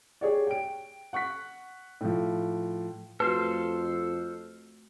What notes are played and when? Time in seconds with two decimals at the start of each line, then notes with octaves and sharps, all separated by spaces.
0.21 G4 G#4 C#5 D5
0.47 G5 D7
1.13 F#5 C#6 F#6 B6
2.01 A2 F3
3.20 F2 A3 F#4 A4 B4 C5 F5